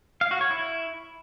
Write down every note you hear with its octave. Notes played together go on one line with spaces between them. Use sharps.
F5
F#4
C#5
E4